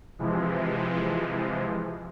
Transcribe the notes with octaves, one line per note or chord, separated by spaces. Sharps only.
C3 E3 F3 G#3